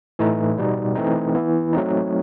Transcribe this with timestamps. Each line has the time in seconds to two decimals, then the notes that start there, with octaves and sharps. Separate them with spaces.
0.19 A2 E3 A3 D#4
0.58 B2 G3 B3 D#4
0.95 E3 A3 C4 D#4
1.35 E3 B3 E4
1.73 F#3 A3 C4 D#4